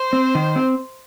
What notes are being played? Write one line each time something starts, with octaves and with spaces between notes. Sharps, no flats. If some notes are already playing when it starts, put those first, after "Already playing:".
Already playing: C5
C4
D#3
C4